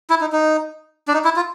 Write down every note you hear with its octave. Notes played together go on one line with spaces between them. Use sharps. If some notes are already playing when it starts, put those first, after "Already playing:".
E4
D#4
D#4
D4
D#4
E4
F4